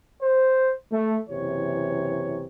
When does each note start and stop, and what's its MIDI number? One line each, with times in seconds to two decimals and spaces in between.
0.22 0.72 72
0.92 1.17 57
1.28 2.44 30
1.28 2.44 48
1.28 2.44 52
1.28 2.44 73